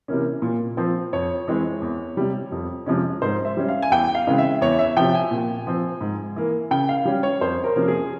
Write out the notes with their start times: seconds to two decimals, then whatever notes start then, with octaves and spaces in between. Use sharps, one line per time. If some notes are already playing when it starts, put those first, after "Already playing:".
0.08 C3 E3 A#3 C#4
0.42 A#2
0.77 F3 C4
1.13 F2 C#5
1.48 E3 G#3 C4
1.82 E2
2.17 C3 G3
2.52 F2
2.86 C3 F3 G#3 C#4
3.22 G#2 C5
3.45 E5
3.57 G3 C#4
3.68 F5
3.82 G#5
3.91 E2 G5
4.15 F5
4.27 C#3 E3 G#3 C4
4.38 E5
4.61 E2 C#5
4.79 E5
4.97 C3 F3 G5
5.15 G#5
5.31 A#2
5.67 F3 C4
6.01 G#2
6.36 E3 A#3
6.71 C#3 G5
6.89 F5
7.05 G3 C#4
7.23 C#5
7.41 F2 C5
7.64 A#4
7.76 C3 F3 A#3 C#4
7.88 G#4